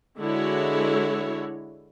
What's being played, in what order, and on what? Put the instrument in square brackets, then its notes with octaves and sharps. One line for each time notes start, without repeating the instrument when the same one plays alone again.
[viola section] D3 G#3 E4 F#4 C#5